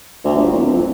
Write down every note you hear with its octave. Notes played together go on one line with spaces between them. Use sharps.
D2
G1
D1
F2